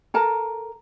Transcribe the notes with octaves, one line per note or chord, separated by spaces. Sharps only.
A4 A#4 A5 A#5